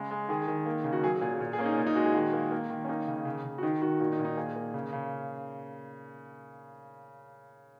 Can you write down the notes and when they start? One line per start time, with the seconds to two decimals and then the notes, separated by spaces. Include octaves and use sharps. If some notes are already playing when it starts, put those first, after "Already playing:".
Already playing: C#3 G#3
0.11 G#3
0.29 D#3 G#4
0.48 D#3
0.66 A#3
0.84 C#3
0.92 F#4
1.03 F#3 G#4
1.21 A#2 G#4
1.40 A#2
1.53 G#4
1.59 A#3 C#4
1.66 D#4
1.77 A#2
1.87 D#4
1.95 G#3 F#4
2.05 G#4
2.14 D#3 F#4
2.33 A#3
2.52 A#3
2.70 D#3
2.85 C#4
2.89 A#3 D#4
3.08 C#3
3.25 C#3
3.44 C#3
3.58 F#4
3.63 D#3 D#4
3.82 D#3 F#4
4.00 A#2 F#4
4.13 D#4
4.19 A#2
4.25 D#4
4.37 A#3 G#4
4.56 A#3
4.74 C#3
4.93 C#3